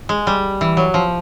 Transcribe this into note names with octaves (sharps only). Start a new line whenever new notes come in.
G#3
G3
E3
F#3
F3